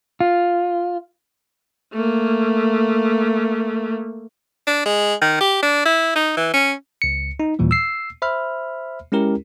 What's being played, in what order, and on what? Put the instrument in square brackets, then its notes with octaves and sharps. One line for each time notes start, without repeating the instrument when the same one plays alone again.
[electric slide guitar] F4
[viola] A3 A#3
[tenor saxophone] D4
G#3
D#3
G4
D4
E4
D#4
E3
C#4
[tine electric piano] C#2 C#7
D#4
D#2 A#2 E3 G3
E6 C7
C5 E5 B5 F6
G#3 C#4 E4 G4 A#4